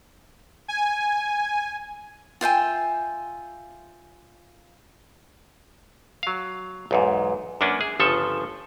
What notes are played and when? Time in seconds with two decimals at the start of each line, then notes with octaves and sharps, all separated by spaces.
0.68 G#5
2.41 F4 E5 G5 G#5
6.23 F#3 F5
6.91 B1 E2 G#2
7.61 F#2 A#3 C#4 D4 B4
7.81 G#4
8.00 G1 C#3 F3 A4 E5